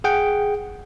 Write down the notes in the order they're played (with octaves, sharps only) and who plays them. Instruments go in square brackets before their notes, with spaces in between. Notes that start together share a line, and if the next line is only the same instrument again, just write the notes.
[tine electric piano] G#4 F#5 G5